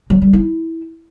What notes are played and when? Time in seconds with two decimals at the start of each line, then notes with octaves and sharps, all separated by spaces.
0.10 F#3
0.22 G3
0.33 E4